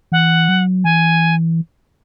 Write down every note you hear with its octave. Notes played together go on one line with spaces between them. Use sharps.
E3 F#5
F#3
E3 G#5